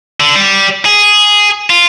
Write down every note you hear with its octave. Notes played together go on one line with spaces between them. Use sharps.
D3
G3
G#4
F4